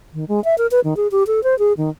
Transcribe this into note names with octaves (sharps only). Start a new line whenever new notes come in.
D#3
G#3
E5
A#4
B4
D#3
G#4
G4
A4
C5
G#4
D#3